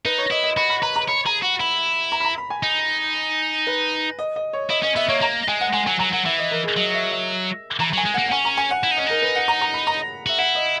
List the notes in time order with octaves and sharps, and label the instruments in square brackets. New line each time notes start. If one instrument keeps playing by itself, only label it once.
[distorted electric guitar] D#4 [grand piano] B4
[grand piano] C#5
[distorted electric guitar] E4 [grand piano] D#5
[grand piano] D#5
[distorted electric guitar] F#4 [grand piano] B5
[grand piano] B5
[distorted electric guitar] B4 [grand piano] A#5
[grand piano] A#5
[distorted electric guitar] C#5 [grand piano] B5
[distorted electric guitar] G#4 [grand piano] A#5
[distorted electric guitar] F#4 [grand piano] F#5
[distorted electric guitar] E4 [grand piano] B5
[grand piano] A#5
B5
A#5
B5
G#5
[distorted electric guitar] D#4
[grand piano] B4
D#5
D#5
C#5
[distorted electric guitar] E4 [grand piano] D#5
[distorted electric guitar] C#4 [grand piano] D#5
[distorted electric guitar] B3 [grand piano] E5
[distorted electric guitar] A#3 [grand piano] C#5
[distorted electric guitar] A#3 [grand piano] A#5
[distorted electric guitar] G#3 [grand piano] G#5
[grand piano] F#5
[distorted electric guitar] G#3 [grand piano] G#5
[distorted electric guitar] F#3 [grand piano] G#5
[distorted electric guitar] F#3 [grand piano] A#5
[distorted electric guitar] F#3 [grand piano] F#5
[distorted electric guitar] E3 [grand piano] E5
[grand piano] D#5
A#4
G#4
[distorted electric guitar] F#3 [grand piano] D#5
[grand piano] E5
E5
[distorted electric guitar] E3 [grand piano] A#5
[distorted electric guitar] F#3
[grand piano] G#5
[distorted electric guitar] G#3
[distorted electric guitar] A#3 [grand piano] F#5
[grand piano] F#5
[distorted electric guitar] C#4 [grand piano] G#5
[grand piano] A#5
G#5
F#5
[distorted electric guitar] E4
D#4
[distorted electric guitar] C#4 [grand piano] D#5
[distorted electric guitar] D#4 [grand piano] A#4
[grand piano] B4
F#5
A#5
A#5
B5
A#5
[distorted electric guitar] F#4 [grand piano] E5
[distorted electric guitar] E4 [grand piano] F#5
[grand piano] D#5